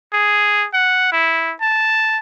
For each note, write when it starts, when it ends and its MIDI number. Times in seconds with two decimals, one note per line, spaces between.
0.13 0.67 68
0.74 1.12 78
1.12 1.53 64
1.61 2.18 81